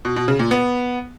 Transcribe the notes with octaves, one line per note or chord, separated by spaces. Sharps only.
B2
B2
C#3
A#2
B3